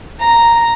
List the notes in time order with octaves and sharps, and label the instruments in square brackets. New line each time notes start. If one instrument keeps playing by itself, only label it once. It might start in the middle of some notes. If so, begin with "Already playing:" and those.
[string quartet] A#5